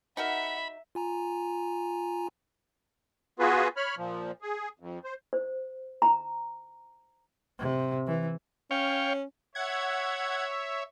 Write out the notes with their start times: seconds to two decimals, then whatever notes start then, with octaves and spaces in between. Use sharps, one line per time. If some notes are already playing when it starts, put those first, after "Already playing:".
0.17 D#4 F#4 A#4 E5 F#5 B5
0.95 F4 G#5 A#5
3.39 B3 F4 F#4 G#4 B4
3.77 C#5 B5 F6
3.97 A#2 F3
4.42 G#4
4.79 F2
5.04 C5
5.33 C5
6.02 A#5
7.59 C3
8.07 E3
8.71 C#4 C#5 F5 G5
9.55 C#5 E5 F#5 G#6